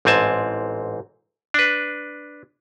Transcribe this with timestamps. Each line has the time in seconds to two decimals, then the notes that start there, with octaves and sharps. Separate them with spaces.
0.05 A1 G#2 C4 G#5 A5
1.54 D4 B4